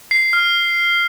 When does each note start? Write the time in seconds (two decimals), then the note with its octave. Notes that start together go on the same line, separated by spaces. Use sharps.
0.11 C7
0.33 F6